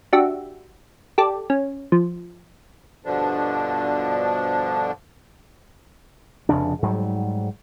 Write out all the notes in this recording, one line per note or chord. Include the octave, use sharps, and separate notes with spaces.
D4 F#4 G4 E5
G4 A4 D5
C#4
F3
G2 B2 D3 F3 D4
F1 F2 C#3 D4
G#2 F#3 G3